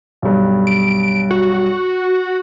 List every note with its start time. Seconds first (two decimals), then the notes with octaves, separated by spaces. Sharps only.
0.22 B1 G2
0.67 D7
1.31 F#4